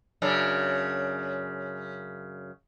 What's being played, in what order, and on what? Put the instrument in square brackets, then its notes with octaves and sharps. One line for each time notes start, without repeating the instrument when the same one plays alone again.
[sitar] F#2 C#3 D4